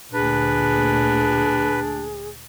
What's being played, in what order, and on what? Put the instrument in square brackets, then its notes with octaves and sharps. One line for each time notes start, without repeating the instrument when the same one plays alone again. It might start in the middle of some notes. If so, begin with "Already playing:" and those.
[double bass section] D2 A#2 [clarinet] D4 [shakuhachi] G#4 [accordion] B4